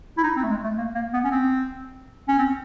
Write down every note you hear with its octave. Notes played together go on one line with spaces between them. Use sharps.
E4
D#4
C4
A3
G#3
A3
A#3
A#3
B3
C#4
C4
C#4
C4